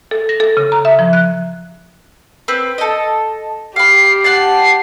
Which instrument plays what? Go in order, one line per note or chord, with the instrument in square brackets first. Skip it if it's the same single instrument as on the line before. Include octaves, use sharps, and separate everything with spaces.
[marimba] A4
A#6
A4
C#3
A#5
E5
F3
F#6
[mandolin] C4 B4
A4 D#5
[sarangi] G4 [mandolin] F5 B5 [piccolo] C7
[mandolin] F#5 A5 [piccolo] C7